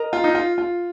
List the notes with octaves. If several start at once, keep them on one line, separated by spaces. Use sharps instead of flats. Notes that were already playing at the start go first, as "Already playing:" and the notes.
Already playing: A#4 D#5 A#5
F4
D#4
F4
F4